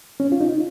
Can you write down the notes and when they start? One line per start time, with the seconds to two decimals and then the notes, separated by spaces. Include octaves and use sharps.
0.20 C#4
0.32 F4
0.41 D#4